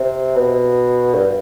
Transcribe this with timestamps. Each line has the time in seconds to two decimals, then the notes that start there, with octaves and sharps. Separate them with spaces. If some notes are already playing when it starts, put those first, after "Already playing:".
Already playing: C3
0.36 B2
1.14 G2